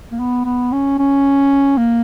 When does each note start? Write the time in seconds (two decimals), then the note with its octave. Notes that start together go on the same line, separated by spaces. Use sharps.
0.12 A#3
0.19 B3
0.45 B3
0.72 C#4
0.99 C#4
1.77 A#3